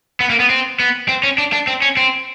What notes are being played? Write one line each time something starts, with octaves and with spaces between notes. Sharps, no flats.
B3
A#3
B3
C4
B3
C4
C#4
D4
D4
C4
C#4
C4